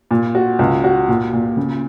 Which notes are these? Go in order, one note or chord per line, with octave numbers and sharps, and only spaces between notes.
A#2
F#4
C#2
F#4
A#2
A#2
C#3